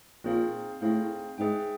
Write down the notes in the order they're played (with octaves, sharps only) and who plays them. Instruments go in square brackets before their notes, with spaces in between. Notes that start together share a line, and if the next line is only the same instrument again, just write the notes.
[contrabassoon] A#2 [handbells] C4 D#4 G#4 C5 F5
[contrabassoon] A2 [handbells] C4 D#4 G#4 C5 F5
[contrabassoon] G#2 [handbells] G#4 B4 E5 G5